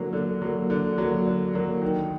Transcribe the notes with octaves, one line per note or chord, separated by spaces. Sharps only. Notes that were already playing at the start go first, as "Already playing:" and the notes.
Already playing: D3 F#3 A#3
D3
F#3 A#3
D3
F#3 A#3
D3
F#3 A#3
D#3